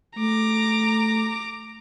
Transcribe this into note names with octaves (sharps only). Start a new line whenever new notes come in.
A3 A#5 D6